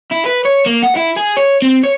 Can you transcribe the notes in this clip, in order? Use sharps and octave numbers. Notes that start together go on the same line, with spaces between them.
E4
B4
C#5
A#3
F#5
E4
G#4
C#5
C4
C#5